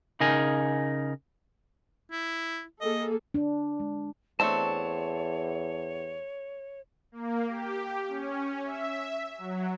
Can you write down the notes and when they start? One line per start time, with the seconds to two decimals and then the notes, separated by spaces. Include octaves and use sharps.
0.20 C#3 D#4 A#4 G#5
2.12 E4
2.81 A#3 G#4 A4 D#5
3.34 D4
3.80 G#3
4.40 E2 A3 C4 D4 C#5 A5 C#6
7.12 A#3
7.47 G4
8.08 C#4
8.64 E5
9.38 F#3